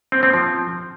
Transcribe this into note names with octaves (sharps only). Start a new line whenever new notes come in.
C4
C4
F3